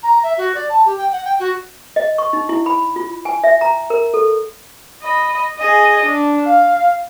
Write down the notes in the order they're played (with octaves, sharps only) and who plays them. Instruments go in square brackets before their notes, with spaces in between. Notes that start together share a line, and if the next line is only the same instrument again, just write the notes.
[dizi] A#5
E5
F#4
D5
A5
G4
G5
F#5
G5
F#4
[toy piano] D#5
C#6
D#4
E4
B5
F4
G#5
E5
A#5
A#4
A4
[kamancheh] D#5 B5
G#4 D#5
D4
F5